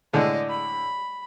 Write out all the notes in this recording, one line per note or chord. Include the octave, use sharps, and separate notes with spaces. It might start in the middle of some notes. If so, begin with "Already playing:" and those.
A2 D3 G#3 D5 D#5
B5